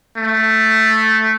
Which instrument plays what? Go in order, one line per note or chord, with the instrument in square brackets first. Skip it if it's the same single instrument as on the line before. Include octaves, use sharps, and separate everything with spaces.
[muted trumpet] A3